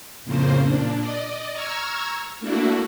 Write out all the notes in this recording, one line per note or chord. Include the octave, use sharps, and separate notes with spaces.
F2 A2 C#3 A#3 C5
A#2 D4
D5 D#5
A#5 C#6 E6 F6 G#6
A3 A#3 D4 E4 F#4